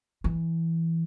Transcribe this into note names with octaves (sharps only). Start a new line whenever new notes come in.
E3